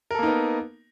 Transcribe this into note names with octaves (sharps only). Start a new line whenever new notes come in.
A#3 B3 D#4 A4 A#4